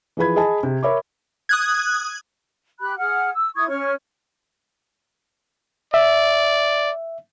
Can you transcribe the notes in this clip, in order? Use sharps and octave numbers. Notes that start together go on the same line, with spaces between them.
E3 F3 G#4 B4 B5 G#6
G#4 D#5 G#5 A5 B5
C3
A#4 C#5 E5 B5 D6
D#6 F#6 G#6
G4 B5 F#6
G#4 F#5 F6
E6
E4 C#6 D#6 G#6
C#4 C#5 C#6 F6
D5 E5